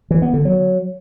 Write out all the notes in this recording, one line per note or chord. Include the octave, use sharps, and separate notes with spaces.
E3
B3
D3
F#3